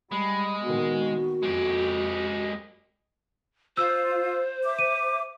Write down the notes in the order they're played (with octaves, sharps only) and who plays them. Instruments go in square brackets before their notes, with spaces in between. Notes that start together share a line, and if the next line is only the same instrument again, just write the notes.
[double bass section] G3 [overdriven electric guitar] G#3 [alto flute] B5
[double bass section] A#2 D#3 B3 [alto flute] F#4
[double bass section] F2 [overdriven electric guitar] G#3 G4
[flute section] F4 [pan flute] C5 [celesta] E6
[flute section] E5 D6
[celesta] D#7